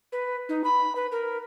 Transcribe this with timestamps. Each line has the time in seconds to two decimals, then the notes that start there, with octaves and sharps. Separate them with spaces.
0.12 B4
0.49 D#4
0.64 B5
0.96 B4
1.12 A#4